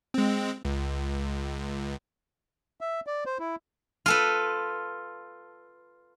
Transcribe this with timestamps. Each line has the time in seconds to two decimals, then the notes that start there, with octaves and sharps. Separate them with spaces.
0.14 G#3 C4
0.65 C#2
2.81 E5
3.07 D5
3.26 C5
3.39 E4
4.06 F4 A4 B4